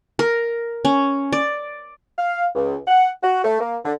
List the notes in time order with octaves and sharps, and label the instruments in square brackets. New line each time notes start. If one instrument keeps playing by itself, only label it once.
[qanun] A#4
C#4
D5
[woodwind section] F5
C#2
F#5
F#4
A3
A#3
D3